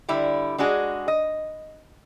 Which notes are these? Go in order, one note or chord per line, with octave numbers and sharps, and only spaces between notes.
D3 G3 E4
G#3 D4 F#4 G#4
D#5